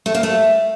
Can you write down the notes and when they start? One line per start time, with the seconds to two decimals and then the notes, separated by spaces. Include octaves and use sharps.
0.06 A3
0.14 A#3
0.23 A3